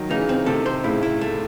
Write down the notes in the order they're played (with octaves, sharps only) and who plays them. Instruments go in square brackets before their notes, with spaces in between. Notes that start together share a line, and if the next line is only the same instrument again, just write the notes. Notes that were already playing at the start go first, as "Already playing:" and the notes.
Already playing: [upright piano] D#3 F#3
[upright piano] C#3 E3 [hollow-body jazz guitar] D#4
[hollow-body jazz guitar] C4
[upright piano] C3 D#3 [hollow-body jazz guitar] A4
[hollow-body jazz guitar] C5
[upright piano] A2 C#3 [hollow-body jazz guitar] E4
[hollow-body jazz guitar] E4
A3